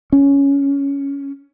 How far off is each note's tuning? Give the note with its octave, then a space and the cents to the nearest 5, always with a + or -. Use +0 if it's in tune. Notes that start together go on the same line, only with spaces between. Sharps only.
C#4 +10